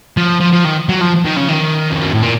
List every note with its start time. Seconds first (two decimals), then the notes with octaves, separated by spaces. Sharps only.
0.17 F3
0.41 F3
0.53 F3
0.65 D#3
0.89 F#3
1.01 F3
1.25 D#3
1.36 C#3
1.48 D#3
1.91 F2
2.01 F#2
2.12 A2
2.22 A#2